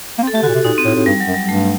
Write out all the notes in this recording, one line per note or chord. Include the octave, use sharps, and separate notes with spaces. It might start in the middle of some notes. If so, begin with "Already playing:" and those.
A#3
C4
A4
A3 G4
D3 F#4
A#2
C3
A#2 D#4
C4
A2
A2
G2 G3
F#3
F#2
G3
G2 A3